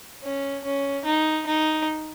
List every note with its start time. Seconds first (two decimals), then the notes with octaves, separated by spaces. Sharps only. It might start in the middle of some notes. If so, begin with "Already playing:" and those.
0.23 C#4
0.64 C#4
1.05 D#4
1.46 D#4